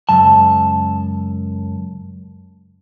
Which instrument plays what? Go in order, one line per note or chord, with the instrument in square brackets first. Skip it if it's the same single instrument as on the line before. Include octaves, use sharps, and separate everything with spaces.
[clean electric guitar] C#2 F#2 A5